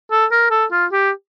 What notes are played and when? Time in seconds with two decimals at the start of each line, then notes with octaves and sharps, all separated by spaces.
0.11 A4
0.32 A#4
0.51 A4
0.72 F4
0.92 G4